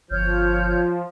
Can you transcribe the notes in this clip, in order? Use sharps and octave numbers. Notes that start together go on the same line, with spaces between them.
G1 F3 C#5 F6 G6